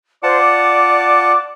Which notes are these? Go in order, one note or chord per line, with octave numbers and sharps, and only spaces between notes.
F4 C5 D5 F#5 A5
D6